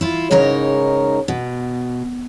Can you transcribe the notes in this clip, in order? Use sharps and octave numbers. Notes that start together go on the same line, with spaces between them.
E4 F4
G#2 C#3 D#4 A#4 C#5
B2